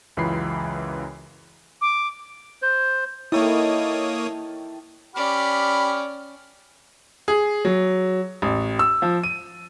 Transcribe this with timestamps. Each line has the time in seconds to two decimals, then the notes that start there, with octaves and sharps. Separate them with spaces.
0.17 C#2 F#2 E3 F4 B5 C7
1.81 D6
2.62 C5
3.32 D#3 A#3 E4 A4 C#5 G5 D#6
5.16 C#4 G4 D5 B5 F6
7.28 G#4
7.65 F#3
8.42 A1
8.79 E6
9.02 F3
9.23 D#7